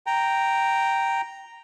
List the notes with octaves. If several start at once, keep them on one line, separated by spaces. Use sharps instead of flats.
G5 A#5